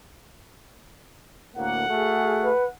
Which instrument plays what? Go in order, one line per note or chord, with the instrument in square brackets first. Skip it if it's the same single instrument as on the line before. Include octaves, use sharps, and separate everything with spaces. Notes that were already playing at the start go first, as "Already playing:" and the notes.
[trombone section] D2 A2 A#3 [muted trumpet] F#5
[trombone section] A3 F#4 G#4
[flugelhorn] B4